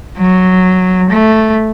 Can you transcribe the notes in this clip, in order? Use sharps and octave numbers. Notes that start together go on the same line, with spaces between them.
F#3
A3